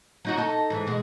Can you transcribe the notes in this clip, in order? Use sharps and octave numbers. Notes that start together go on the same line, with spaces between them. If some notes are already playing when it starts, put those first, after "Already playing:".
F#3 D#4 F#4
D#4 A4
G#2 E3
B2 G#3